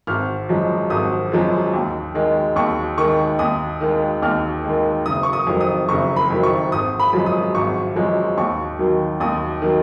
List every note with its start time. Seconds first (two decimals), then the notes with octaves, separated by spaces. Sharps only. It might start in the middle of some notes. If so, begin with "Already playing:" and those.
0.07 G#1 F6
0.49 F#2 F3 G#3
0.90 G#1 D#6
1.32 F#2 F3 G#3
1.74 D#2
2.15 D#3 G#3
2.56 D#2 C#6
2.98 D#3 G#3 C#6
3.39 D#2 D#6
3.81 D#3 G#3
4.22 D#2 F6
4.64 D#3 G#3
5.06 F#1 D#6
5.23 C#6
5.33 D#6
5.47 F2 D#3 F#3
5.61 D#6
5.89 F#1 C#6
6.16 B5
6.31 F2 D#3 F#3
6.43 C#6
6.72 G#1 D#6
7.00 B5
7.13 F#2 F3 G#3
7.26 D#6
7.55 G#1 C#6
7.96 F#2 F3 G#3
8.37 D#2 C#6
8.79 D#3 F#3
9.20 D#2 D#6
9.62 D#3 F#3